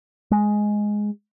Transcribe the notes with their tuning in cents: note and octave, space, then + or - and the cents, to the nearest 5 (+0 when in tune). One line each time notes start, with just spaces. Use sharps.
G#3 +5